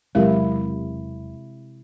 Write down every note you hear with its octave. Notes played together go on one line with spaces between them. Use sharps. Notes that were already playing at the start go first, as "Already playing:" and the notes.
E1 C3 F#3 G#3 E4 G4 A#4